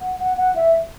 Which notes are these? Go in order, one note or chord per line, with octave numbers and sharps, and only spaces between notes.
F#5
F#5
F#5
E5